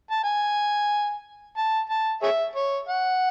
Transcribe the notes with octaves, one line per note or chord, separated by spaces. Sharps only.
A5
G#5
A5
A5
G#4 C#5 E5
C#5
F#5